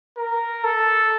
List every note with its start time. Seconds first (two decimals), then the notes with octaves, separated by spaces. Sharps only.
0.18 A#4
0.64 A4